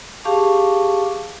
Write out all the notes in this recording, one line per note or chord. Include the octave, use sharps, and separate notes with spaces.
G4 G#4 F5 A5 C#6 D6